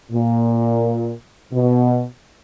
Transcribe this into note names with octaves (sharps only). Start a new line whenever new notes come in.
A#2
B2